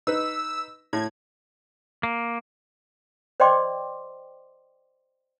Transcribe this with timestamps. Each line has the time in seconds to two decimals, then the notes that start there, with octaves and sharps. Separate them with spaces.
0.07 D#4 B4 E6
0.93 A2 G#6
2.03 A#3
3.40 C5 D5 D#5 G5 C6 D6